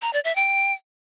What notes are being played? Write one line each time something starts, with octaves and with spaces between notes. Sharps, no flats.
A#5
D5
E5
G5